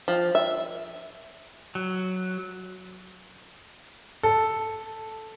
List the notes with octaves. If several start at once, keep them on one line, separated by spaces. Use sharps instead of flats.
F3
E5
F#3
A4